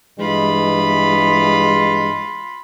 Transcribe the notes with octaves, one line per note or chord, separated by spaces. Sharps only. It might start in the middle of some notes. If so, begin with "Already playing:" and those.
G2 E3 G#3 F4 B5